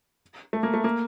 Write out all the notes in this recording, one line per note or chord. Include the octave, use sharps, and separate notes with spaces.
A3
A#3
A3
A#3